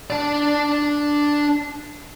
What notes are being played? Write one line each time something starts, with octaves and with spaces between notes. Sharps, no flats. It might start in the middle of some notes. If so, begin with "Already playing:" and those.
D4 D5